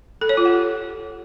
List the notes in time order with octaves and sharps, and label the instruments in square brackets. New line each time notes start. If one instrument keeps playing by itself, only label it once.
[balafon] A4
C#5
F4
F#5
G4